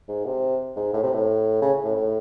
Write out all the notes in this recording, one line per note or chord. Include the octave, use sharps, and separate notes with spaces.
G#2
C3
G#2
A2
C3
A2
C#3
A2
A2